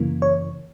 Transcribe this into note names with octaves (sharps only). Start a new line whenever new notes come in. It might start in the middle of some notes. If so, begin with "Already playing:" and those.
Already playing: F#2 C#3 E3 A#3
C#5